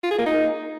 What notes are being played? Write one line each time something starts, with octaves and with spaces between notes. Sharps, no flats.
F4
G#4
A#3
D#4